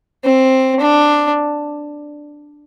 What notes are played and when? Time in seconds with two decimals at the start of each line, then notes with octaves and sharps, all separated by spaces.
0.25 C4
0.80 D4